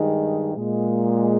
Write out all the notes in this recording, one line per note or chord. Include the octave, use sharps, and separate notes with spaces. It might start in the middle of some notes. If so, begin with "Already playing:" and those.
Already playing: G2 D#3 G#3
A#2 G#3